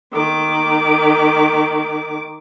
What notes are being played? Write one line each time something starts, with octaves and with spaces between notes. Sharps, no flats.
D#3 D6